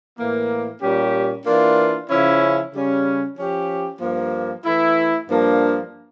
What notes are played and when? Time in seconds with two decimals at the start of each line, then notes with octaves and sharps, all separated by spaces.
0.18 A2 E3 A#3
0.81 A#2 G3 C#4 G4
1.45 E3 A#3 D4 F4
2.09 C#3 F3 C#4 E4
2.73 C#3 G3 C#4
3.37 F3 C#4 G4
4.00 G2 F3 A#3
4.64 E3 A3 E4
5.28 G2 F3 A#3 D4